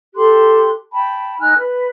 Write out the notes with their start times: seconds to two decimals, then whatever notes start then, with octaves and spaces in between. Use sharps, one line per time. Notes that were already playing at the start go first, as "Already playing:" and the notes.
0.16 G4 A4 C6 F#6
0.92 G5 A5 B5
1.39 D#4 G#5 F6 F#6
1.59 B4